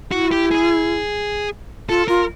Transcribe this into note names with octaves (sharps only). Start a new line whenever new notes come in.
E4 F#4
G4
G#4
F4 A4
F4 A#4